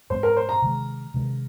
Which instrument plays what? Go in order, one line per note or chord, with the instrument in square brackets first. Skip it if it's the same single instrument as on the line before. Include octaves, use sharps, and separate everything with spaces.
[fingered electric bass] G#2 G#3 C4 [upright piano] C5
[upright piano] A#4
C5
A#5
[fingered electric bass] C3 D#3 G#3
C3 D#3 G#3